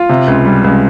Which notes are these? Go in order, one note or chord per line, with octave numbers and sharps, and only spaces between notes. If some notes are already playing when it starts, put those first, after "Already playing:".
Already playing: F4
C3
C#2
G3
C#2